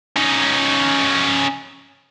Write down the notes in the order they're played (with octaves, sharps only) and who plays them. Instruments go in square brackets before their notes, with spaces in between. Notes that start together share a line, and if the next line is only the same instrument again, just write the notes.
[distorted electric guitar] C#4 D#4